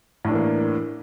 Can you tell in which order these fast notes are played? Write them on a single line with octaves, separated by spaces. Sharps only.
A2 D4 E3 A#3